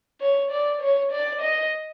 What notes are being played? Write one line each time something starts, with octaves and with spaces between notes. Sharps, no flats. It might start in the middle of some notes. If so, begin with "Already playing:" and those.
C#5
D5
C#5
D5
D#5